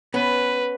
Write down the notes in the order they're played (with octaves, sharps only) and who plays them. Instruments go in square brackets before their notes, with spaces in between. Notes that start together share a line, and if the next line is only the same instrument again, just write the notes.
[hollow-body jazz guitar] B3 C#4 [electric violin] B4